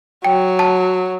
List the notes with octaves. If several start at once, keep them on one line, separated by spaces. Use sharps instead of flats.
F#3 G5
A5